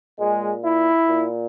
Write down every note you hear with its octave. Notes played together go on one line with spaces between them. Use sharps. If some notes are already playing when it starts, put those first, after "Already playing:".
A#2 G#3
E4
A#2